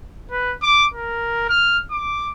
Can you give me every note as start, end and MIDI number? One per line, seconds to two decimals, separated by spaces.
0.31 0.55 71
0.62 0.85 86
0.94 1.48 70
1.49 1.79 89
1.91 2.30 86